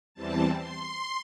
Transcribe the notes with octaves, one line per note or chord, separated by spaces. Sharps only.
E2 E3 G3 C4 A5
C6